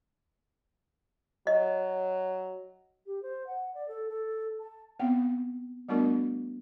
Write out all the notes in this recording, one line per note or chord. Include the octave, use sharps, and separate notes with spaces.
F#3 D#5
G4
C5
F#5
D5
A4
A4
A5
B3 C4 F5
G3 A3 B3 D4 F#4 A#4